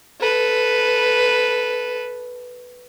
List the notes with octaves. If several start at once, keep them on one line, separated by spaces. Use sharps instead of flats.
A4 B4